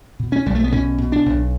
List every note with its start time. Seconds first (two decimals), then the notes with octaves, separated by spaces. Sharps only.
0.20 B2
0.32 C#4
0.46 B1 G3
0.55 A3
0.64 B3
0.72 B2 C#4
0.98 B2
1.12 D4
1.26 B1